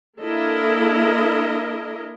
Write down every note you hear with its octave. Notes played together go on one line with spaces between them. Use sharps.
A#3 D4 E4 A4 A#4 D#5